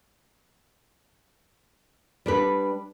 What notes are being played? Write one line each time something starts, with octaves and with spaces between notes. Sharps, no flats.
G3 D4 B4